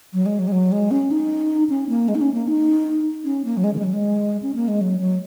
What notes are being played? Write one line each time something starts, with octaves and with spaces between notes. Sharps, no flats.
F#3
G#3
F#3
G#3
F#3
G#3
C#4
D#4
C#4
A#3
G#3
D#4
C#4
A#3
D#4
C#4
A#3
F#3
G#3
D#3
G#3
F#3
G#3
C#4
A#3
G#3
F#3
F#3